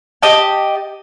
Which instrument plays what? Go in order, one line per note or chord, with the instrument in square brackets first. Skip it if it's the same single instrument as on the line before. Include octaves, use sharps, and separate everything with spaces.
[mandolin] G4 D#5 A5